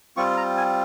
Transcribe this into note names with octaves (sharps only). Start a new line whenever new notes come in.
G3 C4 F4 C#6
A#5
G#5